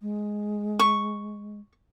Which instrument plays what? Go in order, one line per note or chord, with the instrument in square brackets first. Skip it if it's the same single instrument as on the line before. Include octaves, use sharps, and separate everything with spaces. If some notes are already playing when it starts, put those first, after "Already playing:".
[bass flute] G#3
[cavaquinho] C#6